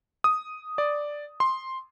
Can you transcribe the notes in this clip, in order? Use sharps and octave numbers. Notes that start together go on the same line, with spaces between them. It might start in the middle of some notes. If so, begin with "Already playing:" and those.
D#6
D5
C6